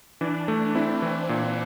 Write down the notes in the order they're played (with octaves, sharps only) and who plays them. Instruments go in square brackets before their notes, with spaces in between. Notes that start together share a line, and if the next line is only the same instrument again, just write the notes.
[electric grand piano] E3 [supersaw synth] D4
[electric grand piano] A3
[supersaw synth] C4 [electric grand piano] E4
[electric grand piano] E3
A#2